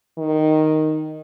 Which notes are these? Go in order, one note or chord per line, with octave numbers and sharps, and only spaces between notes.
D#3